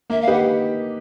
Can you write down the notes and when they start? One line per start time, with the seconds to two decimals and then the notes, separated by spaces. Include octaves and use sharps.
0.10 A#3 E5
0.21 F5
0.28 D#4 G4 B4 F#5